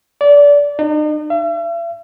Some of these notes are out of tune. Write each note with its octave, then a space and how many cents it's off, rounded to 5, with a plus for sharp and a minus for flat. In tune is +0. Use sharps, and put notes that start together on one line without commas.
D5 -25
D#4 -45
E5 +45